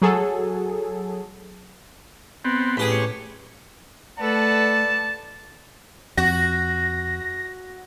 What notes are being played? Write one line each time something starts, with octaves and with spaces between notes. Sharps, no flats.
F#3 G#4 A4
B3 C4
A1 G4 G#4 B5
C#5
A3 A4 B4 D5 F#5 A5
F2 F#4 A#6